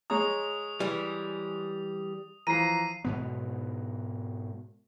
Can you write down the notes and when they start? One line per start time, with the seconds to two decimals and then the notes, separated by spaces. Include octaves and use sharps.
0.10 G#3 C#5 A#5 D#6
0.80 E3 G3
2.47 E3 F3 A#5 C7 D#7
3.04 G#2 B2 B3